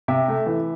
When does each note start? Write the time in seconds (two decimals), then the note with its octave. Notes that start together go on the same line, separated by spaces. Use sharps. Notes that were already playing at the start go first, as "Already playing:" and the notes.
0.08 C3 E5
0.28 A3
0.46 E3